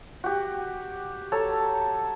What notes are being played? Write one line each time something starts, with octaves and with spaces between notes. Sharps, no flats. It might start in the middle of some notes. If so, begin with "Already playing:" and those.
F#4 G4
A4 C#5 A5 A#5